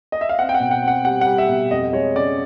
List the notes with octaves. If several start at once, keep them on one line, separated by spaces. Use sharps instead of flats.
D#5
E5
F5
C4 F#5
G5
F#5
B2
F#5
C4 F#5
G3 F#5
F#5
G3
E5
B2
F2 D#5
G#3 C#5
C#3 D5